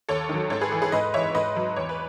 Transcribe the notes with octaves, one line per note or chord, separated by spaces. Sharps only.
D#2 A4 C#5
D#3 F#3
G#2 A4 C#5
G#4 B4
E3 A4
G#4 B4
G#2 B4 D#5
E3 C#5 E5
G#2 B4 D#5
F#3
E2 C#5
B4